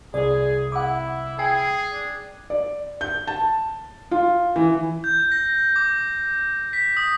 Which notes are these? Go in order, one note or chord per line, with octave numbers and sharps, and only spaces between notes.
C2 G#4 D5
E4 F#5 D6
G#4 G5 G#5 C7
D4
D5
G6
A5
F4
E3
G6
A#6
D6
B6
D#6